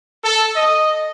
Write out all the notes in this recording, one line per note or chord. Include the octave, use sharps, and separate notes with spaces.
A4
D#5